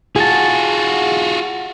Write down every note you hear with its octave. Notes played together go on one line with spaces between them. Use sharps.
F4 F#4 G#4 A5